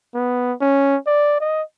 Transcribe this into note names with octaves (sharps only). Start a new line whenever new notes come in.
B3
C#4
D5
D#5